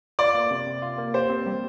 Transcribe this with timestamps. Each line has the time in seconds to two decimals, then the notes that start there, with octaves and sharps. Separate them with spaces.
0.19 F4 D5
0.35 A#3
0.51 C3
0.67 C3
0.82 F4
0.98 A#3
1.14 G4 C5
1.30 C4
1.46 G3